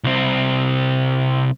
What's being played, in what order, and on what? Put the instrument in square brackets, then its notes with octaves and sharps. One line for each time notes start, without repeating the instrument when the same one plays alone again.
[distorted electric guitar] C2 C4